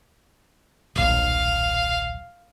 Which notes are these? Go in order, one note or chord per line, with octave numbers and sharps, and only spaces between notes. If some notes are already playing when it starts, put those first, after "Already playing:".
D#1 B1 F5